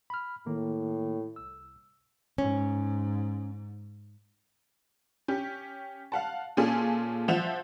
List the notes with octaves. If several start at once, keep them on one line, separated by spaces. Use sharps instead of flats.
B5 F6
A2 D#3 A#3
C2 E6
G#2 C#4
C#4 G4
F5 F#5 A5
A#2 C#4 F4 G#4 A4
F3 E5 F#5 E7 F7